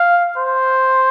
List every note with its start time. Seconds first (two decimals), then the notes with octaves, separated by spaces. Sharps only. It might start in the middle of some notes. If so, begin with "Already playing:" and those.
Already playing: F5
0.37 C5